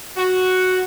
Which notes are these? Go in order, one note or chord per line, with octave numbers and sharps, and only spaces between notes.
F#4